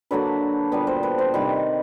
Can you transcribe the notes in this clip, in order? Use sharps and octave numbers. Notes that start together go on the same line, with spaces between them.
D3 F#3 A#3 D4 B4
A#2 G3 B3 B4
C5
B4
C5
C3 D#3 G3 B4